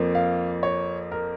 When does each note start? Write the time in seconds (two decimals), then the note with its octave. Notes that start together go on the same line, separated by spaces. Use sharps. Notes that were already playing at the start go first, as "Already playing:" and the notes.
Already playing: F2 F3 A#3
0.15 F5
0.63 C#5
1.12 A#4